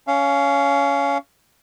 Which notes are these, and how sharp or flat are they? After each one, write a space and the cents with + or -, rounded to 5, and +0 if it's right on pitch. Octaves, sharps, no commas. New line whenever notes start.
C#4 +20 F5 -15